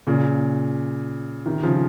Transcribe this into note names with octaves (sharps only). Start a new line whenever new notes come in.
A#2 C#3
C3 D#3
C#3 F3